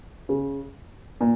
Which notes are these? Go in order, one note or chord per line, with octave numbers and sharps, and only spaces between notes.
C#3
A#2